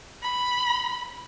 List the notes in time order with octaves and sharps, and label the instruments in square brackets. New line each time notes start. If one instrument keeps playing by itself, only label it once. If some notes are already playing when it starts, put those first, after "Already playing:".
[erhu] B5